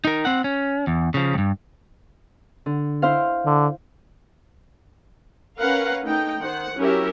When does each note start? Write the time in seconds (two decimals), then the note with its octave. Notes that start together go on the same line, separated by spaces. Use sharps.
0.05 D#4 A#4
0.25 C4 F#5
0.44 C#4
0.87 E2
1.14 C#3 F3
1.34 C#2 G2
2.66 D3
3.02 E4 C5 F5
3.45 D3
5.59 C#4 A#4 B4 F5 F#5
6.04 A3 D#4 G5
6.40 D#3 C5 F#5
6.77 F#3 C#4 E4 G4 A#4 E5